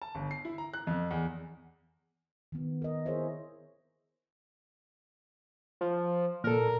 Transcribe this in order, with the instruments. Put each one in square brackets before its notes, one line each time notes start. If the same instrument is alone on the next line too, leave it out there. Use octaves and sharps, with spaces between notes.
[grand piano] A5
G1
C7
E4
A#5
F#6
F2
E2
[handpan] D#3 B3
A#4 D#5
E4 G#4 A#4 C5 C#5 E5
[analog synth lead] F3
[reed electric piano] A#2 A4 [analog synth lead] A#4